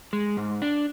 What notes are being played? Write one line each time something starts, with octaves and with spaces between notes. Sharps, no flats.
G#3
G#2
D4